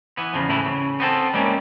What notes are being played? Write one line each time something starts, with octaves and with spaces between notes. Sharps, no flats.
E3 B3
E2 C#3 F3
A2 C#3 E3 E4
C#3
B3 C4 A4
G3 G#3 A#3 C#4